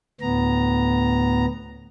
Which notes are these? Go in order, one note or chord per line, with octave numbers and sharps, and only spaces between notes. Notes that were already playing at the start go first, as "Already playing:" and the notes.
D2 A2 B3 A#5